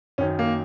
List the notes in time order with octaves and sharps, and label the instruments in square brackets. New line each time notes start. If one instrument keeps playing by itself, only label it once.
[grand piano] F#2 D#3 F#3 C#4
A#3